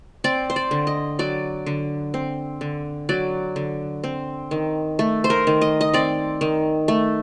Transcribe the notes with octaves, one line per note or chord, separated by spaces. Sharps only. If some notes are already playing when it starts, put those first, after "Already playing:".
C4 D5
C5
D5
D3
D#5
F#3 D5
D3
C4
D3
F#3 D5
D3
C4
D#3
A3
C5
A#4
D#3
D#5
D#5
C4 D5
D#3
A3